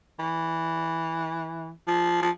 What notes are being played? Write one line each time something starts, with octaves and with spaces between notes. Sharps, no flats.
E3
F3
F3